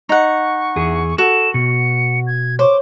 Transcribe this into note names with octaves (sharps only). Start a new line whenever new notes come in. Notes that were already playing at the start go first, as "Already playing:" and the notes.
D#4 F#5 C#6
E2 G#4
F#4 A4 E7
B2 C#7
G#6
C5 C#5 C#6 D6